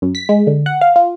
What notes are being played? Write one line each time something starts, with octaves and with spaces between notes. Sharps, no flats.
F#2
B6
G#3
D3
F#5
F5
F4